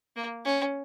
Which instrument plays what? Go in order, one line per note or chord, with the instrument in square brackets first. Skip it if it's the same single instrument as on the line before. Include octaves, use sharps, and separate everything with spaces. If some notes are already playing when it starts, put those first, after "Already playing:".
[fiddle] A#3
C#4